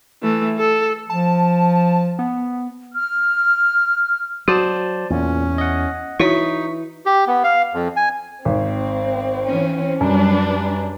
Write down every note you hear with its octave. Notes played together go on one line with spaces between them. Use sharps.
E3 A3
A4
F3 A5
B3
F6
F#3 F#4 C5 D5 A5
E2 A#2 C#4
D#5 F#5
E3 D#4 E4 F#4 C#5 C#6 B6
G4
B3
F5
F2
G#5
G#1 C4
E3 C#4
F#2 F#3 G3 D4 B4